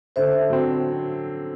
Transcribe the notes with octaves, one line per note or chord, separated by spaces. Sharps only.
D3 C5 E5
F#3 C4